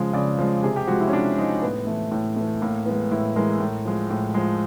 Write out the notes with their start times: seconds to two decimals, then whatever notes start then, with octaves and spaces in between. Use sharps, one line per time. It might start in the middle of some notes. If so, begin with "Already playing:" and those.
Already playing: C#3 F3 G#3 F5
0.13 C#3 D5
0.39 F3 G#3
0.63 C3 G#4
0.76 G4
0.88 F3 G#3 F#4
1.00 E4
1.08 C#4
1.13 C3 D4
1.38 F3 G#3 D#4
1.62 A2 B3
1.87 E3 A3
2.11 A2
2.36 E3 A3
2.61 A2 A#3
2.86 E3 G#3 B3
3.11 A2 E4
3.36 E3 G#3 A#4
3.60 A2
3.85 F3 G#3
4.10 A2
4.34 F3 G#3